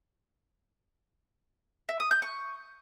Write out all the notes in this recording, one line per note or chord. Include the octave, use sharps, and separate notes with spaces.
E5
D#6
G6
C#6